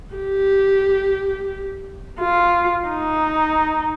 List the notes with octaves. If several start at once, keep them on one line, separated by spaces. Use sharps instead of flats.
G4
F4
D#4